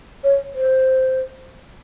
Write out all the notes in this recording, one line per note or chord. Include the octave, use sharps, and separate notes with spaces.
C#5
C5